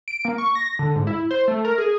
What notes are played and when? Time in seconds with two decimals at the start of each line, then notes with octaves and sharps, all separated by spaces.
0.08 D7
0.25 A#3
0.38 C#6
0.55 A#6
0.79 D3
0.95 G#2
1.07 E4
1.31 C5
1.48 A3
1.65 A#4
1.78 G#4